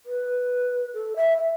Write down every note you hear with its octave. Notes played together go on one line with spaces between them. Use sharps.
B4
A4
E5
E5